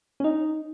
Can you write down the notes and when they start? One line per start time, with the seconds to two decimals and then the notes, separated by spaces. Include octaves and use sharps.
0.20 C#4
0.24 D#4